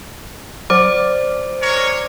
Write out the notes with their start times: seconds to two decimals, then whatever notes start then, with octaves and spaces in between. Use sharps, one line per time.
0.70 F#3 C5 D5
1.62 G#3 A#4 C#5